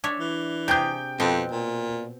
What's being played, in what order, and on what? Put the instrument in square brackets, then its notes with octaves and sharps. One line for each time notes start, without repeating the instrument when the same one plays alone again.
[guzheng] D4 C#5 E5
[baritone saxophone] E3
[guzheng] C3 G4 G#4 [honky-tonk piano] G5 G6
[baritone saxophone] F2 [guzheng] B2 C4
[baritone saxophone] A#2